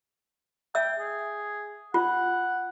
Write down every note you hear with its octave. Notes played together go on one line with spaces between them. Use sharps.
E5 G5 E6
G#4
F4 F#5